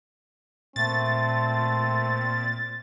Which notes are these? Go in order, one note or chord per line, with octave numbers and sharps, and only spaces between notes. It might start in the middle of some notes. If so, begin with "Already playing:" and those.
A#2 A3 C4 A6